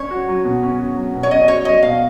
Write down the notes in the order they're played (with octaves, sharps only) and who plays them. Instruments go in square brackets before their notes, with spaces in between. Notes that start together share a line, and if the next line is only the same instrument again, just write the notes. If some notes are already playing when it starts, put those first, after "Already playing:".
Already playing: [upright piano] C#4 [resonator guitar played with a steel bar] C#5
[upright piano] F#4
F#3
B2
C#4
F#4
F#3
B2
[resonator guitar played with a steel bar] C#5
[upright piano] C#4 [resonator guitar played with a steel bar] D#5
[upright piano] F#4 [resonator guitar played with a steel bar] C#5
[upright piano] F#3 [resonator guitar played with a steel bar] D#5
[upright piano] B2 [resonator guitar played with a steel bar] F5